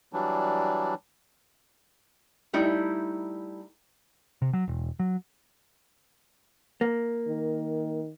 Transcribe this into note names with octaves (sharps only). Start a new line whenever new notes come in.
E3 F#3 G3 D4
G3 A3 D#4 E4
C3
F#3
E1
F#3
A#3
D#3